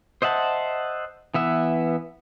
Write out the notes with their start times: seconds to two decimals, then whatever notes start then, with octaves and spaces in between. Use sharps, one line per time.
0.22 C5 D#5 E5 F#5 A5
1.34 E3 B3 E5